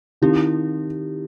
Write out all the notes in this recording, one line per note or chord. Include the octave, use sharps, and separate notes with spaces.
D#3 C4 E4 G4